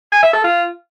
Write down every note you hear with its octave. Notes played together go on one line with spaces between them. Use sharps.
G#5
E5
A4
F4